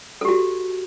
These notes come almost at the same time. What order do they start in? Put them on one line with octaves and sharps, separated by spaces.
A4 G4 F#4